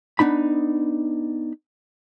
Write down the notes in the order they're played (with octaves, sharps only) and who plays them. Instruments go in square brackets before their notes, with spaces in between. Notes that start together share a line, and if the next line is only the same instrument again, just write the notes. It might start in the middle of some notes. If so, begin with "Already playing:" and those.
[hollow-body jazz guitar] B3 D4 D#4 B5